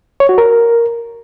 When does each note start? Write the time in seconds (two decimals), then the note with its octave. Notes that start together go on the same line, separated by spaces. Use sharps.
0.20 C#5
0.29 F#4
0.38 A#4